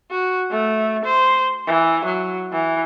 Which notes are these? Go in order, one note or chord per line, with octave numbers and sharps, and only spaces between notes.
F#4
A3
C5
E3
F#3
E3